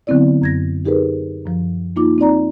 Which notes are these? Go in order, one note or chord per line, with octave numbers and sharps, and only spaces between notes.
D3 F#3 B3 C4 E4 D5
F#2 G#6 A#6
D#4 G4 G#4 A#4 B4
F#2 F3
A#3 D#4 F4 D6
C4 D#4 D5 A#5